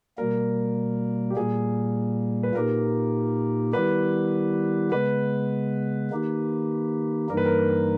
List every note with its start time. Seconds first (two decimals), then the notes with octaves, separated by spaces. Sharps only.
0.18 B2 G3 A#3 A#4
1.30 G4
1.36 A#2 G3 A#3 G#4
2.43 B4
2.55 A#2 A#3 D#4 G4 A#4
3.73 D#3 G3 B3 E4 G4 B4
4.92 C#3 G#3 B3 B4
6.11 D#3 A#3 D#4 G4
7.30 G2 E3 G3 A#3 D#4 A#4
7.37 B4
7.45 A#4